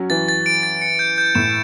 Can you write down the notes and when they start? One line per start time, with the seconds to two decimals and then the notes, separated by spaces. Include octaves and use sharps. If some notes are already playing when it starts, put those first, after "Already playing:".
Already playing: F#3 C#4
0.10 E3 A6
0.29 A6
0.46 D7
0.63 A6
0.81 C#7
0.99 G6
1.18 G6
1.35 A2 E7